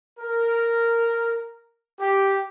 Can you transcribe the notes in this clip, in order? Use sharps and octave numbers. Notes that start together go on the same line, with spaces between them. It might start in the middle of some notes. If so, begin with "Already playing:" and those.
A#4
G4